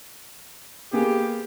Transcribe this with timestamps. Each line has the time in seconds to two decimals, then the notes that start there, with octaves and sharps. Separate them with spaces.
0.93 A#3 B3 G4 G#4